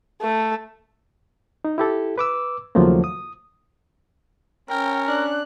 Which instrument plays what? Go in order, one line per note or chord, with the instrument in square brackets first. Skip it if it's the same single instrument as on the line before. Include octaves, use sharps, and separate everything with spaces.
[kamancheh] A3
[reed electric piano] D#4
E4 G4 A4
B4 D6 E6
D#2 C#3 F3 F#3 A3 A#3
D#6
[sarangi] C#4 [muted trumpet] A#4 [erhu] G5
[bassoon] D4 [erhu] F#6